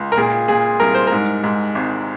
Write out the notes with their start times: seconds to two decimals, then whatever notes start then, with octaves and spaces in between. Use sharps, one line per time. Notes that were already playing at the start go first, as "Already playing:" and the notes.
Already playing: C#2
0.12 A#4
0.17 A#2 G#4
0.48 A#2 G#4
0.80 C2 A#4
0.94 C5
1.07 A#4
1.12 G#2
1.44 G#2
1.75 G#1